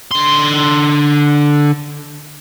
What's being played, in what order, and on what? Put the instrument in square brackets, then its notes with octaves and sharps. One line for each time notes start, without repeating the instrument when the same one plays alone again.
[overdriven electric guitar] D3 C6